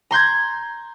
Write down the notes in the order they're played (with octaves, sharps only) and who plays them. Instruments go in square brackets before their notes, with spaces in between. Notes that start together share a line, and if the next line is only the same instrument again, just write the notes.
[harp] A#5 C6 G6 G#6